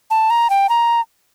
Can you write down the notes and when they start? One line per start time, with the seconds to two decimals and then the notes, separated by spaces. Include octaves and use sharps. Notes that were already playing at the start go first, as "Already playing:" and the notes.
0.11 A5
0.30 A#5
0.50 G5
0.69 A#5